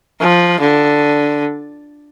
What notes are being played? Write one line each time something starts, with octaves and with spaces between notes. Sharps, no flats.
F3
D3